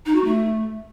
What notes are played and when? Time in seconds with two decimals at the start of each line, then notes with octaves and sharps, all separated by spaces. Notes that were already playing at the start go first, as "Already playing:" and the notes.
0.06 D#4
0.15 F#4
0.24 A3